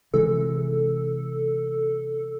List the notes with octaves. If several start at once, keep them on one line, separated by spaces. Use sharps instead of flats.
C3 E3 G#3 A4